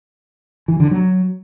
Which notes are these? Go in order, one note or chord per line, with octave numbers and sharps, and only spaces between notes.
E3
D3
F#3